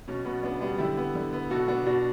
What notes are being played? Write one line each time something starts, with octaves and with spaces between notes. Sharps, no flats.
B2 C#4
B2 B3
C#3 B3 D4
G3 B3 D4
D3 E4 G4
B3
D3
B3
B2 F#4 A4
B3 D4 F#4
B2 D4 F#4